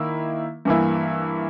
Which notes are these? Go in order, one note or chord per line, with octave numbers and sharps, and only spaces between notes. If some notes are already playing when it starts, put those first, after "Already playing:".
Already playing: D#3 A#3 E4
G2 E3 A#3 E4